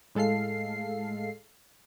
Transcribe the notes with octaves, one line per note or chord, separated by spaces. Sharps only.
A2 G#3 A4 F5 C7